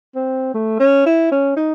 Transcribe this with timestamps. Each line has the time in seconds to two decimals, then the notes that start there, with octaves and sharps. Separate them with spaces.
0.16 C4
0.54 A3
0.80 C#4
1.06 E4
1.32 C#4
1.57 D#4